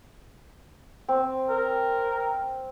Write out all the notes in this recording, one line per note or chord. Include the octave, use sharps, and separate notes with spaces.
C4
A#4